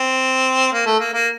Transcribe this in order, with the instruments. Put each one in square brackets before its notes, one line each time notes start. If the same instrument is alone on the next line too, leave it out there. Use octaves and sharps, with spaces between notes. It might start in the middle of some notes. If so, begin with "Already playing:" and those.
Already playing: [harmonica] C4
A#3
A3
A#3
A#3